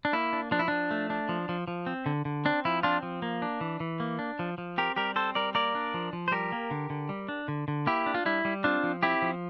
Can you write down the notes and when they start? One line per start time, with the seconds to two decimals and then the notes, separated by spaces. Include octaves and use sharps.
0.05 D4
0.13 A#3 E4
0.33 D4
0.51 F3 D4
0.59 E4
0.68 F3 D4
0.91 A3
1.10 D4
1.29 F3
1.49 F3
1.68 F3
1.87 C4
2.06 D3
2.25 D3
2.45 C4 D4
2.65 F3 E4
2.83 C4 D4 F4
3.03 F3
3.22 A#3
3.42 D4
3.61 E3
3.80 E3
4.00 A#3
4.19 D4
4.39 F3
4.58 F3
4.78 C4 G4 A#4
4.96 G3 G4 A#4
5.16 C4 A4 C5
5.35 G3 A#4 D5
5.55 A#3 A#4 D5
5.75 D4
5.94 F3
6.13 F3
6.28 C5
6.31 G3 G4 A#4
6.52 A#3
6.71 D3
6.90 D3
7.09 G3
7.29 D4
7.48 D3
7.68 D3
7.86 A#3 E4 G4
8.06 D4
8.14 F4
8.26 G3 E4
8.45 G3
8.64 C4 D4 F4
8.84 F3
9.03 C4 E4 G4
9.22 F3